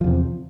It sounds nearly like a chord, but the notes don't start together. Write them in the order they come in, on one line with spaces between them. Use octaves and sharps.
F3 E2 C3